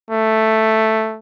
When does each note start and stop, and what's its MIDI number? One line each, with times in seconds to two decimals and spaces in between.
0.10 1.19 57